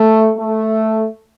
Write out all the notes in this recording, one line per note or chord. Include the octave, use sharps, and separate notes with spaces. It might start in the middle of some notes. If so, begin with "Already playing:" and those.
Already playing: A3
A3